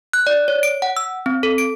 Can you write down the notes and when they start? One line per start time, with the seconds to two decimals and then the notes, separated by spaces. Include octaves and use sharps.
0.13 F#6
0.27 D5
0.48 C#5
0.63 D7
0.82 F#5
0.97 E6
1.26 C4
1.43 A4
1.58 D7